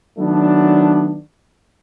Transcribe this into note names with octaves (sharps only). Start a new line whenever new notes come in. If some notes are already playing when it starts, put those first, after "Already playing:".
D#3 F#3 A3 B3 D4